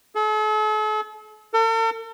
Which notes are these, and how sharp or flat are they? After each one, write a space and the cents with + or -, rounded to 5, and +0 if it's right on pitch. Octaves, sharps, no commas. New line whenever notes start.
A4 -45
A4 +45